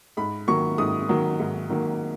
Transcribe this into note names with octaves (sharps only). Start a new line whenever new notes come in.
G#2 B5
D#3 F#3 A#3 C#6
G#2 D#6
D#3 F#3 A#3
G#2
D#3 F#3 A#3